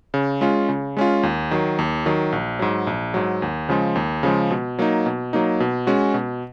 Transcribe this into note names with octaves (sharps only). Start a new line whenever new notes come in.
C#3
G#3 C#4 F4
C#3
G#3 C#4 F4
D#2
D#3 F#3
D#2
D#3 F#3
A#1
G#2 F#3
A#1
G#2 F#3
D#2
C#3 F3 G#3
D#2
C#3 F3 G#3
B2
F#3 A#3 D#4
B2
F#3 A#3 D#4
B2
G#3 C#4 F#4
B2